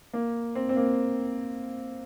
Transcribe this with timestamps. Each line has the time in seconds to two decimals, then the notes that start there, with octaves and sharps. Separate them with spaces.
0.13 A#3
0.55 C4
0.69 C4
0.76 A#3